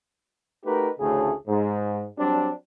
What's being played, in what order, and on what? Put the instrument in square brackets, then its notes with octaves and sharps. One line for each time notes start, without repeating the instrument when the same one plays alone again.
[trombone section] A3 D#4 F#4 G4 A#4 B4
A1 D2 A2 C#3 A3 G#4
G#2
F#3 G3 C4 D4